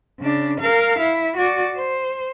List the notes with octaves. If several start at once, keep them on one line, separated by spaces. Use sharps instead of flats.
C#3 D4
A#4 F5
E4
F#4 D5
C5